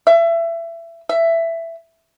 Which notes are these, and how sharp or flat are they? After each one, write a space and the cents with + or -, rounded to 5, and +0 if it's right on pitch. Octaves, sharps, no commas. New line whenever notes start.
E5 +25
E5 +10